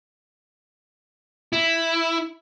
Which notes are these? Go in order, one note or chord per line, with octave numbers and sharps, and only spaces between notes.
E4